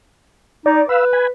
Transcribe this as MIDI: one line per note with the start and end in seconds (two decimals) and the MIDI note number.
0.66 0.81 63
0.66 0.88 74
0.89 1.28 71
0.89 1.05 77
0.89 1.05 83
0.89 1.05 88
1.13 1.27 80
1.13 1.27 83